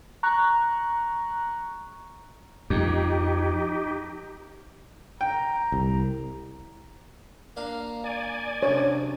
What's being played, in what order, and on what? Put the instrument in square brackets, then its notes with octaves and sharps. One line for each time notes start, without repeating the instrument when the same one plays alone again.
[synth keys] A#5 C#6 F#6
[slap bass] F2 [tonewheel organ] D#4 G4
[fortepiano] G5 [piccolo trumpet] A#5
[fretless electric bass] C2
[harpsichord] A#3 D4 F5
[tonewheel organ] D5 G#5
[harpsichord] C3 [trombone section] F#3 C#4 D4 [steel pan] C#5